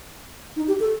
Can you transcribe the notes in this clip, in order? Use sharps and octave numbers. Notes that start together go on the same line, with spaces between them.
D#4
G4
A4